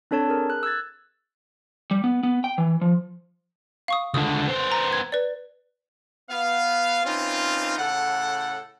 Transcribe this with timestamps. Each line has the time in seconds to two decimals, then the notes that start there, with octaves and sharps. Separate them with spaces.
0.11 C4 D4 A4 C#5 A5
0.29 G#4 A#4
0.50 F#6
0.63 E6 F#6 G#6 A6
1.91 G3
2.04 B3
2.23 B3
2.44 G5
2.58 E3
2.81 F3
3.88 F5 C#6 D#6
4.14 C#2 D3 D#6
4.48 B3 C5
4.72 A#5
4.93 G#6
5.12 B4 D5
6.29 B3 F5
7.05 E3 C4 C#4 D#4 F4
7.78 A2 C#3 A4 F#5